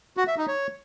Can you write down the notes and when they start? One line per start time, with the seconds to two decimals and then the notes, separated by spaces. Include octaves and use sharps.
0.17 F#4
0.27 E5
0.38 D#4
0.48 C#5